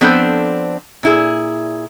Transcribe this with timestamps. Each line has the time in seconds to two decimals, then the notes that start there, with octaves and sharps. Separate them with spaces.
0.01 F3 B3 C4 D4 A4 C5
1.03 A#2 E4 G#4